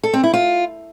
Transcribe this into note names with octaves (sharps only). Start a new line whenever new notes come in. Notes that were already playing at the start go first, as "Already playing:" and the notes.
A4
C4
E4
F4